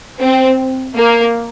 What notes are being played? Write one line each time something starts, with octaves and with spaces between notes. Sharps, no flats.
C4
A#3